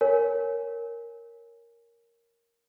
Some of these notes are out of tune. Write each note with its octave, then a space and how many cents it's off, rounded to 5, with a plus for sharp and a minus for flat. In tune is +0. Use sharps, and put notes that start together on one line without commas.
A#4 +0 C#5 +0 G#5 +0